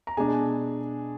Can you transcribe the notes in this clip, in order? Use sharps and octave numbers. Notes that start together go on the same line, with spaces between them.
A#5
B2 G#3 D4 G#4 G#5